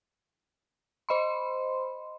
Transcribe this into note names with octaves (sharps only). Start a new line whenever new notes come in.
C5 D#5 B5 C6